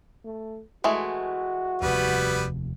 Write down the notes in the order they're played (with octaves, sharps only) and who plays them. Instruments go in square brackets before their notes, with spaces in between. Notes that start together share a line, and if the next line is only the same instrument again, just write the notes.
[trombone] A3
[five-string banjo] E3 G#3 A3 [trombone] F#4
[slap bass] F1 D#2 [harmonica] G3 B3 B4